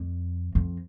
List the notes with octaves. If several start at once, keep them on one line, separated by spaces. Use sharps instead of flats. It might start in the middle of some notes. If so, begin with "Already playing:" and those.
Already playing: F2
F2